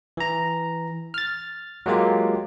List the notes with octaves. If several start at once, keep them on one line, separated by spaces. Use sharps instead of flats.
E3 A#5
F6 A6
F#3 G#3 A#3 F4 G4